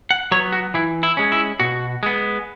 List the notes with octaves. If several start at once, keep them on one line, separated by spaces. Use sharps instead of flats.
F#5
F#3 B3 C#5
F#4
E3 E4
E4
G#3 C#4
E4
B2 F#4
G#3 B3